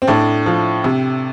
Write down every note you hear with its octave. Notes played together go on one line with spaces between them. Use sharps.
C4
A2 D4
F3
C3